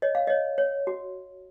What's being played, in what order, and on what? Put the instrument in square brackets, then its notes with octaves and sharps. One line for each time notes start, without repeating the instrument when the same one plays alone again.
[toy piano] C#5 D#5
F5
C#5 D#5
C#5
F#4